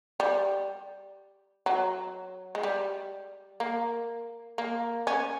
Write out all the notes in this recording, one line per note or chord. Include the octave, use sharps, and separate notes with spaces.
G3
F#3
G#3
G3
A#3
A#3
C#4